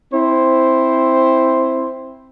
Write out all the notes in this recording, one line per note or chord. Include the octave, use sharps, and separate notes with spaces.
C4 E4 C5